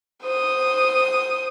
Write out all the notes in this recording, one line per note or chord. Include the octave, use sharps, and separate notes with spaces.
C5 D#6